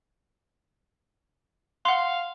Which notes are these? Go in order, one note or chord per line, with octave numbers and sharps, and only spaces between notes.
F5 F#5 C6